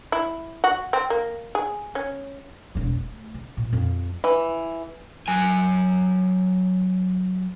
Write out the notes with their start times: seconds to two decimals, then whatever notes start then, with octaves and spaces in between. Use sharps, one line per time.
0.12 E4
0.64 F#4
0.93 C4
1.10 A#3
1.55 G#4
1.95 C#4
2.75 E1 C#3
2.93 A3
3.34 C#3
3.57 A#2
3.73 F2
4.24 E3
5.28 F#3 G#5